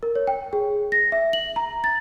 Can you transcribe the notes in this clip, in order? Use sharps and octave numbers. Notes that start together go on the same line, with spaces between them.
A#4
C#5
G5
G#4
A#6
E5
F#7
A#5
A6